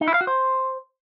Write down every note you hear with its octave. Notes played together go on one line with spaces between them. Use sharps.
D#4
E4
F5
F#4
C5